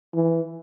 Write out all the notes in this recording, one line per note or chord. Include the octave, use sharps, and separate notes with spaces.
E3